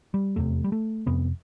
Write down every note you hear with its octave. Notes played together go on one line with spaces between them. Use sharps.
G3
F1 E2 C3 A3
G3
A3
F1 F2 C3 B3